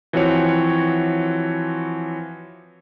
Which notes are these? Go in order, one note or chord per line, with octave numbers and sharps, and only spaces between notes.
E3 F3 C4 F#4 C#5